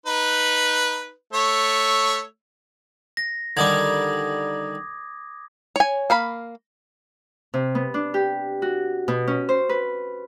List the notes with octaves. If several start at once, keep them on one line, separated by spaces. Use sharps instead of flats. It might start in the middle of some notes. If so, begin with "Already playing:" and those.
D#4 B4
A3 C#5 E6
A#6
D3 D#3 G3 D6 D#6 G#6
C#5 G#5
A#3 F5 B5
C3
B3
D4
G4
F#4
B2
C#4
C5
B4